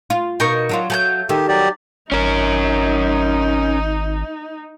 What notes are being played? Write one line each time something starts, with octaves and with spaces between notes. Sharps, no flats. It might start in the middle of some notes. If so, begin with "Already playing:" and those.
F4
B2 D#4 A#4 C#6
F#3 D4 F4
F#3 A3 A5 G6
D#3 G4 A4
F#3 G4 D5
G#1 C#4 D#4 A#4